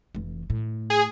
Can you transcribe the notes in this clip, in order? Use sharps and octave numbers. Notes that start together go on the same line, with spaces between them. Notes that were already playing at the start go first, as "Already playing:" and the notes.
F1 E3
A2
G#4